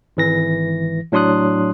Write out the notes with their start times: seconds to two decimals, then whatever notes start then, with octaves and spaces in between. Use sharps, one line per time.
0.17 G#1 E3 A#6
1.12 A2 F#3 D4 C6 D#6 F#6